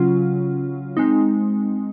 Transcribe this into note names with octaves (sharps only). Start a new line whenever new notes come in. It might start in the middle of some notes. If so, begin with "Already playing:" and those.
Already playing: C#3 F#3 C#4 F4
G#3 C4 D#4